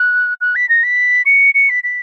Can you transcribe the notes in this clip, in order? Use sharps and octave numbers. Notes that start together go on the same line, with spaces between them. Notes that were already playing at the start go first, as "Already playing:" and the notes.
Already playing: F#6
F#6
B6
A#6
B6
C#7
C#7
B6
B6